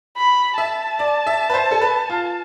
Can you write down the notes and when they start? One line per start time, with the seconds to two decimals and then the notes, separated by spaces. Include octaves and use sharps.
0.17 B5
0.58 E5 A5
0.99 D5
1.27 E5
1.50 B4
1.54 C5
1.71 A4
1.81 B4
2.10 F4